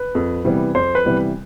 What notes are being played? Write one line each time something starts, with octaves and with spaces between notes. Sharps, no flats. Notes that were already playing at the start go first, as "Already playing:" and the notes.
Already playing: B4
F2
C3 E3 G3 B3
F2 C5
B4
C3 E3 G3 B3